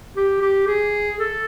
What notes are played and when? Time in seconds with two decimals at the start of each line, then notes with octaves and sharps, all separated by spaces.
0.16 G4
0.42 G4
0.67 G#4
1.19 A4